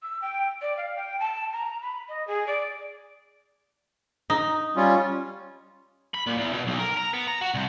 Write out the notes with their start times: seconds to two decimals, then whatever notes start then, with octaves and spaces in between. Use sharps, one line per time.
0.03 E6
0.22 G5
0.61 D5
0.77 F5
0.96 G5
1.20 A5
1.53 A#5
1.82 B5
2.09 D#5
2.27 G#4
2.47 D5
4.30 D#4
4.76 G3 C#4 F4
6.14 B5
6.27 A#2
6.38 E2
6.53 B2
6.67 B1
6.79 A#4
6.97 A#5
7.13 B3
7.28 A#5
7.41 F#4
7.54 C2